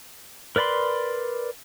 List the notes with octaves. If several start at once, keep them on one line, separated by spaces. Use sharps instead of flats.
A#4 B4 D5 B5 C6